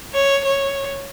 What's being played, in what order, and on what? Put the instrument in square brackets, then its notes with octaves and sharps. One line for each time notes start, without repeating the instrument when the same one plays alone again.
[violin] C#5
C#5